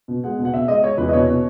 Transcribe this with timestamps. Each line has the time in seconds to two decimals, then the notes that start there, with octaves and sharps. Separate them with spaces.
0.08 B2
0.24 G#3 F#5
0.39 B2
0.45 F#5
0.53 B2 E5
0.68 G#3 D#5
0.83 G#3 C#5
0.98 E2 B4
1.09 D#5
1.13 B2 C#5
1.28 B2